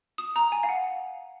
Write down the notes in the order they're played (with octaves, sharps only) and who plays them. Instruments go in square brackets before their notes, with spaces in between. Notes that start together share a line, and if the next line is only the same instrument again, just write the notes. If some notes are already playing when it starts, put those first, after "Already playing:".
[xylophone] D#6
A#5
G#5
F5
F#5